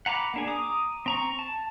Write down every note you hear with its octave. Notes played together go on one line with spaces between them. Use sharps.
F#5 A#5 B5 D6
A#3 D4 G#4
A#5 D6 D#6
C4 A#5 C#6
A5